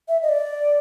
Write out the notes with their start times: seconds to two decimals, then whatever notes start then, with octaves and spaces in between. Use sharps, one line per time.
0.08 E5
0.23 D#5
0.29 D5